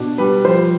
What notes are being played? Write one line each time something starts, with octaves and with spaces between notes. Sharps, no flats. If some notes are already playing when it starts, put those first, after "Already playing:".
Already playing: B2 D4
G3 B4
F3 C5